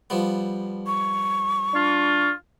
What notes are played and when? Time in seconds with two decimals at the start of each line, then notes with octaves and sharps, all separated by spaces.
0.10 F3 G3 B3
0.87 C#6
1.74 D4 F4